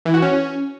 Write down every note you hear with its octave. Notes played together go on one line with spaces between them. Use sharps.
E3
F#4
C#4